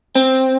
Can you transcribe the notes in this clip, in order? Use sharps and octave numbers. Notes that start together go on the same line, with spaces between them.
C4